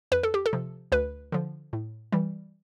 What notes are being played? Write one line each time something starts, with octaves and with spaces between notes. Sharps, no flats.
F2 B4
A4
G4
A4
C3 F3
D2 B4
D3 F3
A2
E3 G3